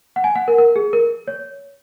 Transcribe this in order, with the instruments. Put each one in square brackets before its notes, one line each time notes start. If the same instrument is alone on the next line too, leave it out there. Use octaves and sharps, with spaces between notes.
[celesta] F#5
G#5
F#5
A#4
A#4
G#4
A#4
C#5